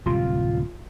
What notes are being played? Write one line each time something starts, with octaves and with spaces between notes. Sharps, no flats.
D1 C3 G3 F4